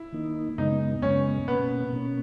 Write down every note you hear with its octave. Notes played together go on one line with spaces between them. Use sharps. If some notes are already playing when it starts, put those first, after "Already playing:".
Already playing: E4
D#3 A#3 D#4
F#2 C#3 G#3 B3 D#4
F#2 C#3 G#3 B3 C#4
B2 A#3 B3 C#4
B2 A#3 C#4